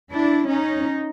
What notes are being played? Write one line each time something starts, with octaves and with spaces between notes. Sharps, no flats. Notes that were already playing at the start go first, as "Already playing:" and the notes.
D4 E4
C#4 D#4